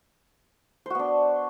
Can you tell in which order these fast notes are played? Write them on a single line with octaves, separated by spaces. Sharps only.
C5 F#4 B3 D4